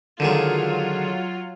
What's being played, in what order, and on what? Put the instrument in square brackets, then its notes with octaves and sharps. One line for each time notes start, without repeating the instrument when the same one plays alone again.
[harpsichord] D3 D#3 G#3 [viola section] F#3 F4